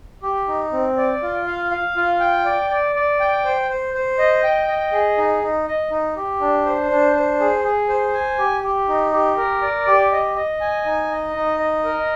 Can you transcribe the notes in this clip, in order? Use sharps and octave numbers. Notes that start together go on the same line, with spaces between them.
G4
D#4
C4
D5
F4
F5
F5
F4
G5
D5
D5
D5
G5
C5
C5
C5
D#5
G5
D#5
G#4
D#4
D#4
D#5
D#4
G4
D4
C5
D4
C5
G#4
G#4
C5
G#5
G4
G4
D#4
G4
A#4
D5
G4
D#5
D#5
G#5
D#4
D#5
D#4
D#5
A#4